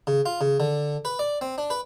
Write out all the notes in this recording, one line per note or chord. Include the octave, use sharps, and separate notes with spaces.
C#3
F4
C#3
D3
B4
D5
C4
D4
B4